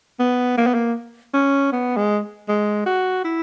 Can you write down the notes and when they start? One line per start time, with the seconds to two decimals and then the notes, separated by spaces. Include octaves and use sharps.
0.20 B3
0.57 A#3
0.66 B3
0.74 A#3
1.34 C#4
1.72 B3
1.97 G#3
2.48 G#3
2.86 F#4
3.25 E4